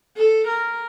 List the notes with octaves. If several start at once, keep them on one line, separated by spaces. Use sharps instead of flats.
A4
A#4